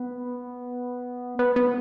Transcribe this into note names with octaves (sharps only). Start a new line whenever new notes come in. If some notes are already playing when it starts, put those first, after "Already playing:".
Already playing: B3
B3
B3